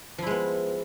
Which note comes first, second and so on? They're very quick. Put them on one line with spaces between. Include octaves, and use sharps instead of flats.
F3 E4 G#3 B3